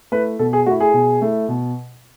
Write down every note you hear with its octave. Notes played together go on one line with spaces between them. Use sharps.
A3 E4 B4
B2 A4
G#4
A3 E4 F#4
G#4
B2
A3 E4
B2